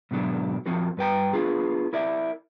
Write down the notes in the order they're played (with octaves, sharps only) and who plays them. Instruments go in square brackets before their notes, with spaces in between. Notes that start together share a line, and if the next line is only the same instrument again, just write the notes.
[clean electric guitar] G#2 B2 D3 F#3 D4
F2 F3 C4 F#4 A#4
G2 B4 G5 A#5
B3 D4 F4 G#4
E4 A#4 D5 E5